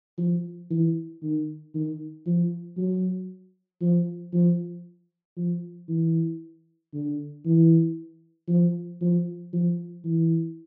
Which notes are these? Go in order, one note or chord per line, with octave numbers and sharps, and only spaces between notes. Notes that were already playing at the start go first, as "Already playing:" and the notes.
F3
E3
D#3
D#3
F3
F#3
F3
F3
F3
E3
D3
E3
F3
F3
F3
E3